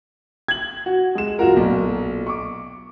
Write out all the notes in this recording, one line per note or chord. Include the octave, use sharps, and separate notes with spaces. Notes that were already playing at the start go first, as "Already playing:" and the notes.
G#6 F#7
F#4
G#3 E7
F#1 F4 F#4 A#4
B1 A#2
C#6 D6